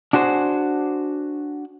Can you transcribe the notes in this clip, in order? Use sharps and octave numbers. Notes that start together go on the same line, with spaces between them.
D4 F#4 G#4 C5